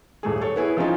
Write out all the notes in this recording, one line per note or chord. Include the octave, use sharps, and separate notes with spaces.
D#1 A3 G#4
A4 C#5
B3 E4 G#4 C#5
E3 F3 C4 C#4 D#4 F4